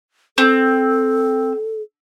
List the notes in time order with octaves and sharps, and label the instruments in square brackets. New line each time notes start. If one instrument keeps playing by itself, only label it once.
[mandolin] C4 [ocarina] A4